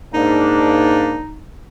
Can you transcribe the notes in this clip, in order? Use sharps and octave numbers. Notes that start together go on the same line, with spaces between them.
G#2 A#3 D4 D#4